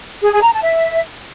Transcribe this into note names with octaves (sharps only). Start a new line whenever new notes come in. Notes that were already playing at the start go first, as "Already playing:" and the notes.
G#4
G#4
A#5
A5
E5